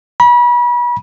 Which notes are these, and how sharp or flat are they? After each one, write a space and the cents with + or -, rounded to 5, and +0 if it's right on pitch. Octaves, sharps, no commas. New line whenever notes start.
B5 -35